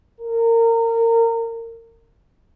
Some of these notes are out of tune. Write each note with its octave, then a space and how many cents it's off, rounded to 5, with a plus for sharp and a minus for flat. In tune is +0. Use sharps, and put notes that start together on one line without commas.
A#4 -25